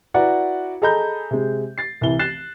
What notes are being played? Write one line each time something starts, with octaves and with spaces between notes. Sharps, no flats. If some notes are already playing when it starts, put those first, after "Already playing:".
E4 F#4 B4 D5 F#5 A#5
G#4 A4 D#5 A#5 B5 G6
C3 G#3
A6 C7
C2 E3 G7
F#6 A6 C7 E7